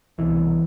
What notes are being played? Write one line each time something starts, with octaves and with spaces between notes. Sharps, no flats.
C2 B2 E3